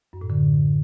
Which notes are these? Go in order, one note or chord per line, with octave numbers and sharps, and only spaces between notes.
F#2
A2
D3